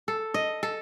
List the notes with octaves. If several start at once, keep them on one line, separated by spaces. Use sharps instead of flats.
A4
D#5
A4